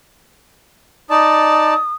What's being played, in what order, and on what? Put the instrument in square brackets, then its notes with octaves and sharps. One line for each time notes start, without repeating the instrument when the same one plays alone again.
[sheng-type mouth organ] D#4 D5 A5 [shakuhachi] D#6